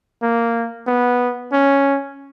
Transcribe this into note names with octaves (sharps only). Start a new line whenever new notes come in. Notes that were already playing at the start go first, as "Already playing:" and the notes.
A#3
B3
C#4